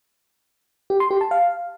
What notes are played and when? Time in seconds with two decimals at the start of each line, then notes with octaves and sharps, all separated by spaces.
0.90 G4
1.00 C6
1.11 G4
1.21 A5
1.31 F5